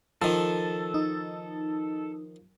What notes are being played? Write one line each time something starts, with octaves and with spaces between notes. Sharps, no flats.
D#3 F3 A4
D#4